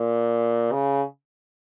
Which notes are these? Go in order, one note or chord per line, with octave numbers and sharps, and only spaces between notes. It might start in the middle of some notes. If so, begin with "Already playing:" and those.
Already playing: A#2
C#3